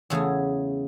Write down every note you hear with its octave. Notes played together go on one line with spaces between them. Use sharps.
E2 C#3 A3 G#4 G#5